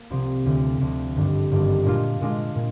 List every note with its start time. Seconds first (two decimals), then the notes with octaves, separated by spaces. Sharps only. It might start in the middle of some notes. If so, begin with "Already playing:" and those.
Already playing: A#3
0.10 C2 C3 F3 C4
0.45 D2 D3 F3
0.81 D2 D3 F3
1.16 G#1 G2 D3 G3
1.51 G#1 G2 D3 G3
1.85 A#2 G#3 D4 F4
2.21 A#2 G#3 D4 F4
2.56 A#2